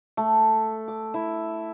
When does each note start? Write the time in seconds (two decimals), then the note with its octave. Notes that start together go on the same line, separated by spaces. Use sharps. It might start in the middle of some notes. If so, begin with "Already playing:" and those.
0.17 A3
0.88 D6
1.14 E4